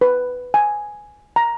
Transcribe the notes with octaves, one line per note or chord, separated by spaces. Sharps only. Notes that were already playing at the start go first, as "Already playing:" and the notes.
B4
G#5
A#5